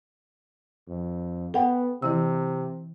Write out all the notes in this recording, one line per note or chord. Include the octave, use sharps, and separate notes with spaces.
F2
B3 A4 F#5 G5
C3 E3 E4 E6